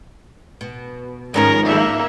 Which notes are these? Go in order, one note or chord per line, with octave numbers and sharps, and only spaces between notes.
B2
G#2 D#3 F3 C#4 A#4
A#3 E5